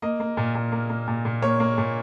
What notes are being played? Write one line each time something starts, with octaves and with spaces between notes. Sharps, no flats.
A#3 D#5
A#3
A#2
A#2
A#3
A#3
A#2
A#2
A#3 C#5
A#3
A#2